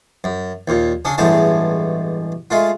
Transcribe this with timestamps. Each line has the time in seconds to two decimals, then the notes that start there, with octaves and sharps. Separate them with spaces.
0.24 F#2
0.68 D#2 A#2
1.05 C#3 C#4 D4
1.18 A1 E2 G2 G#3 A3 A5
2.51 G#3 A3 F4